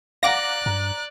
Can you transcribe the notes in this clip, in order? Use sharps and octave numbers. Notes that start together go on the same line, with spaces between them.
D5 F5 F#5 A#5 D6 F#6 A#6
G2 A#5